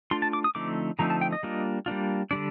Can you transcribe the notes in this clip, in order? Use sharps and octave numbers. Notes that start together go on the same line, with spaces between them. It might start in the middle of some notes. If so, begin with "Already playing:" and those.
A3 D4 F4 C6
A5
D6
D#6
D3 F3 A3 C4 D#4 D6
D3 F3 A3 C4 D#4 A#5
A5
G5
D#5
G3 A#3 D4 F4
G3 A#3 D4 F4
D3 G3 D4 D5